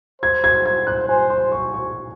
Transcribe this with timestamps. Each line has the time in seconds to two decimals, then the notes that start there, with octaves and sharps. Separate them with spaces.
0.22 C5 G#6
0.44 G#6
0.65 G#6
0.87 F#6
1.09 C5 G#5
1.30 C6
1.52 C#6
1.74 C#6